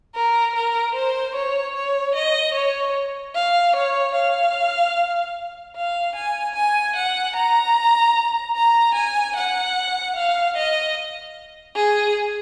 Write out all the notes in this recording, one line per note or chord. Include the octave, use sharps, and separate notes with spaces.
A#4
A#4
C5
C#5
C#5
D#5
C#5
F5
C#5
F5
F5
G#5
G#5
F#5
A#5
A#5
G#5
F#5
F5
D#5
G#4